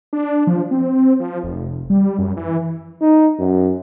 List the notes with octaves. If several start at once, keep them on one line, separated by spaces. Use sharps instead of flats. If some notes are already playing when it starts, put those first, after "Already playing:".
D4
F3
C4
F3
F1
G3
F#2
E3
D#4
F#2